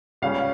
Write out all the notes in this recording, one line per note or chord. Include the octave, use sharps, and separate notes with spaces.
C#2 C#3 G3 C#4 F5